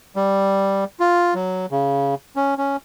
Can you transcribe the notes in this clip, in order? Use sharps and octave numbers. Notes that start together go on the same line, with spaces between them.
G3
F4
F#3
C#3
C#4
C#4